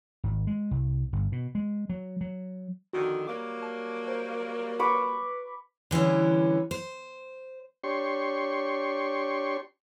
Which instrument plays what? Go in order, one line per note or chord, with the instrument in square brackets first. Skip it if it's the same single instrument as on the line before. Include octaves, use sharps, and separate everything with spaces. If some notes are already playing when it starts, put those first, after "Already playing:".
[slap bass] G#1
G#3
C2
G1
B2
G#3
F#3
F#3
[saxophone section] F2 D3 D#3 [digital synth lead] F#4
[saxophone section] F#3 G3 A#3 [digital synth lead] D6
[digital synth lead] A5
C5
[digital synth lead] B4 [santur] B5 C#6 D6
[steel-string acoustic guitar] D3 E3 G3 C#4
C5
[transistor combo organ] D4 G4 C#5 C6 C#6